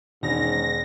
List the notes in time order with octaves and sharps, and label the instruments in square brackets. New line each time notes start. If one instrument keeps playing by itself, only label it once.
[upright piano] E1 [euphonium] G#2 [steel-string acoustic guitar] D#3 C#4 [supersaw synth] A#6